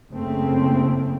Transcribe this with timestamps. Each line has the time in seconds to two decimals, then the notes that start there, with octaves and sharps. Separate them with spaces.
0.11 F#1 C#3 A3 A#3 C4